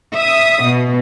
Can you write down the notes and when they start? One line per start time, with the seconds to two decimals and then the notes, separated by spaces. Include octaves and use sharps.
0.16 E5 D#6
0.63 B2